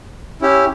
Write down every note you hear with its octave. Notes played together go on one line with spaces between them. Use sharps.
C#4 E4 G4